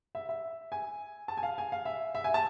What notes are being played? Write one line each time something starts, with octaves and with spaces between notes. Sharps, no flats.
E5
E5
G#5
A5
G#5
F5
G#5
F5
E5
E5
G#5
A5